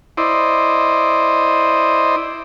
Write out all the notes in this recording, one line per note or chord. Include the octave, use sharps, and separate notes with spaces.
E4 C5 D5 D#5